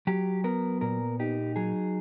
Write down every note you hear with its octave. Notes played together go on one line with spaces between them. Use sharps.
F#3 G4
B3 A#4
A#2 A#4
D#4 G4
F#3 G#4